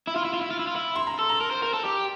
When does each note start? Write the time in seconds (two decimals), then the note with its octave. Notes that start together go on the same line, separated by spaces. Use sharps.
0.07 E4
0.16 F4
0.25 E4
0.33 F4
0.41 E4
0.51 F4
0.59 E4
0.67 F4
0.76 E4
0.96 C6
1.07 A#5
1.19 A4
1.29 A#5
1.40 A#4
1.51 C5
1.62 A#4
1.74 A4
1.85 G4